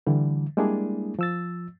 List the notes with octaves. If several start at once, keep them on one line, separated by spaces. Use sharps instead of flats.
D3 E3 G3
G3 G#3 A#3 D4 E4 G#4
F3 E6 A6